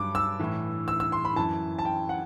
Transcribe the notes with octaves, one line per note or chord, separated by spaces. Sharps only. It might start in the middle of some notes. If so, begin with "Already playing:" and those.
Already playing: G2 F#3 D6
E6
A2 E3
E6
E6
C6
B5
F#2 E3 A5
A5
G5
F#5